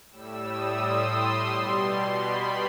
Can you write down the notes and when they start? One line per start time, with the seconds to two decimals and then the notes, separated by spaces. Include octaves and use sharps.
0.11 A2 G3 E6
0.46 D#6
0.80 C6
1.50 B2 G3
2.19 B5